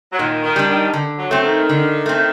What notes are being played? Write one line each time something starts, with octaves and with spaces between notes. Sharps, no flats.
F#3
A#2 D#3
D#3
G3 D4
D#3
D3
F#3
A3 C4
D#3
D3
A3 C4